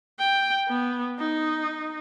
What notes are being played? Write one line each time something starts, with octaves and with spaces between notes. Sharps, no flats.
G5
B3
D#4